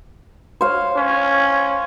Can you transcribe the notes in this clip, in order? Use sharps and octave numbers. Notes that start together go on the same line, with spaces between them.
C5 C#5 F5
C#4